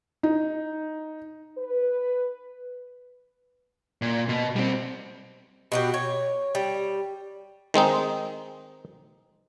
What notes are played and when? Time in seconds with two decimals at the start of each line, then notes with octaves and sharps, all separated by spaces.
0.23 D#4
1.57 B4
4.02 A#2
4.29 B2
4.56 G3 C4
5.72 B2 F#4 G4
5.94 C#5
6.55 G3
7.74 D#3 G#3 C4 D#4